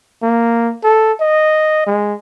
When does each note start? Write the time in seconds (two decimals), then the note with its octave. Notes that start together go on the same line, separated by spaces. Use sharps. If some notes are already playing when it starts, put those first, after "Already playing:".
0.22 A#3
0.84 A4
1.20 D#5
1.87 G#3